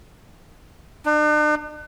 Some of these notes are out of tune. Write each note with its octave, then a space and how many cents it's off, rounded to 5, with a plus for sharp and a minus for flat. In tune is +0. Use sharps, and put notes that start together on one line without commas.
D4 +45